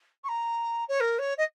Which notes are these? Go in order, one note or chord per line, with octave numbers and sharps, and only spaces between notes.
C#6
A#5
C#5
A#4
C#5
D#5